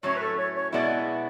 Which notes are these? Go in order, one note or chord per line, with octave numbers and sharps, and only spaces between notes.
A2 F#3 C#4 C#5
B4
A4
C#5
C#5
B2 G#3 B3 E4 D5